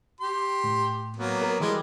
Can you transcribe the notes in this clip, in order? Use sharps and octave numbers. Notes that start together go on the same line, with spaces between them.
G4 C6
A2
F#3 A#3 B3
A#4
E3 G3 G#3 D6 G#6